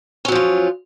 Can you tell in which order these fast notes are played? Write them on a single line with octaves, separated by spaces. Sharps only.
C#4 F#3 F3 F4